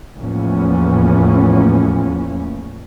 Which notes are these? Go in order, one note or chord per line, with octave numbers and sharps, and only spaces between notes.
E2 A2 F3 A#3 C#4